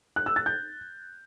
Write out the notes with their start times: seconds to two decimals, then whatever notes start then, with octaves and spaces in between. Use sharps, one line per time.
0.16 F#6
0.26 E6
0.36 A6
0.46 G6